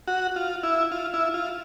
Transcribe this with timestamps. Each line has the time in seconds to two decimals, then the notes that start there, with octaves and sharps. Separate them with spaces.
0.08 F#4
0.36 F4
0.63 E4
0.92 F4
1.14 E4
1.34 F4